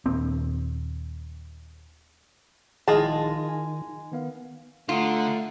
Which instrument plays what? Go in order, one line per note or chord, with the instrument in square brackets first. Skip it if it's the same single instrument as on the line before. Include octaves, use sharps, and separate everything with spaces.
[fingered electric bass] D#1 C4
[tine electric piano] A#1 E4 A#6 [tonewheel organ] D#3 [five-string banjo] G#3 F4 A5 [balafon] G#4
[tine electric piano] G#5
D#3 B3 F5
[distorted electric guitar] D3 [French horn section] A3 [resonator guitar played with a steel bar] F4 [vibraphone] F#5 A#5 D#6